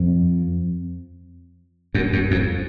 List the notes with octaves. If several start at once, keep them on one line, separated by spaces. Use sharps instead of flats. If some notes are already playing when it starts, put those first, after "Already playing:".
Already playing: F2
F#2
F#2
F2